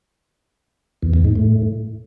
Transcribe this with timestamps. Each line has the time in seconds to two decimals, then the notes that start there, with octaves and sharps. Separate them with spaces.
1.03 E2
1.14 E2
1.25 G#2
1.36 A2